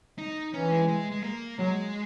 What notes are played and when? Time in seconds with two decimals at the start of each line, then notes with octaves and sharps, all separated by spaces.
0.18 D#4
0.54 E3 C#4
0.72 G#3
0.88 G#3
1.11 G#3
1.24 A#3
1.59 F#3 G#3